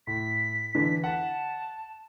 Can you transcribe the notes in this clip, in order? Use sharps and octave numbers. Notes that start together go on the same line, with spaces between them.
A2 B6
D3 E3
F#5 A5